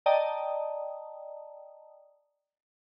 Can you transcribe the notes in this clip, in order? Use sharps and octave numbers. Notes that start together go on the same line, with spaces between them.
D5 D#5 G5 A5 A#5 D#6